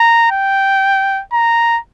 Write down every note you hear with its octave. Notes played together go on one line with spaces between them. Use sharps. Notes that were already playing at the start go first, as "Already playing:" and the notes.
Already playing: A#5
G5
A#5